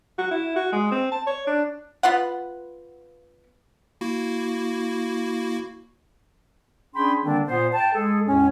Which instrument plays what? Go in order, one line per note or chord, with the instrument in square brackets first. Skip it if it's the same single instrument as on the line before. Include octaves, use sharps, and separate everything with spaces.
[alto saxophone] F#4
E4
F#4
G#3
C4
A5
C#5
D4
[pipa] B3 F4 B4 F#5
[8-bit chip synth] A#3 E4 F#4
[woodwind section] C#4 D4 G#4 G5 B5 C6
D3 D#3 G3 A#3 C4 D4
A#2 B3 C5
G5 A5
G#3 G#4 A4
E2 A2 G#3 C#4